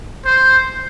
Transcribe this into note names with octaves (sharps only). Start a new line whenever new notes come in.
C5